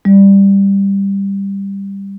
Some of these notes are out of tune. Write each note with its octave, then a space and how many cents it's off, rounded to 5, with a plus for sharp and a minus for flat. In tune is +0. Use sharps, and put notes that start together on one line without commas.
G3 +10